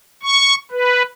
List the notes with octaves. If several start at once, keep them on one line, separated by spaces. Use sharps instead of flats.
C#6
B4